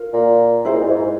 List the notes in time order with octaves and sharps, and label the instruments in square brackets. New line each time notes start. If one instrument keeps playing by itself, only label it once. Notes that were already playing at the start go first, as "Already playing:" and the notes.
Already playing: [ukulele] F4 A#4
[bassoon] A#2
[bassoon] C3 [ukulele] E4 G#4 C5
[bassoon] A#2
G#2
G#2